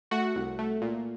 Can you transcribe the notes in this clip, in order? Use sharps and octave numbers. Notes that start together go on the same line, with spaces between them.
A3 F#4 F#5
C2
A3
A#2